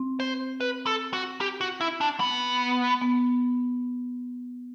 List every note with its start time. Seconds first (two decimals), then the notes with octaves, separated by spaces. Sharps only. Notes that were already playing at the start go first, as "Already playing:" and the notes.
Already playing: C4
0.20 C5
0.61 B4
0.87 A4
1.13 F#4
1.41 G4
1.61 F#4
1.81 E4
2.01 D4
2.20 B3
3.01 B3